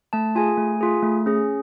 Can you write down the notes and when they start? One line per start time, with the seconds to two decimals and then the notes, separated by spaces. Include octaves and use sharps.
0.13 A3 A5
0.35 F4 G#4 G#5
0.58 A3
0.81 F4 G#4
1.03 A3
1.26 C#4 G#4